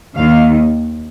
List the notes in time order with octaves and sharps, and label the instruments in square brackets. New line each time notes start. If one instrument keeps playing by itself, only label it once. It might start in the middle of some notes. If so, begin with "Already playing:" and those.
[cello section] D#2 D#3 F5